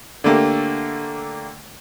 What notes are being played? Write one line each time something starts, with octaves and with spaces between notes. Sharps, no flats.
D3 A3 A#3 G4